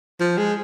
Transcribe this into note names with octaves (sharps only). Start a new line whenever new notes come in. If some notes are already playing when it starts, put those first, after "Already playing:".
F3
G#3